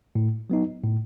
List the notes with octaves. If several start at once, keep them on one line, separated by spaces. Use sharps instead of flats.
A2
F#3 B3 D#4
A2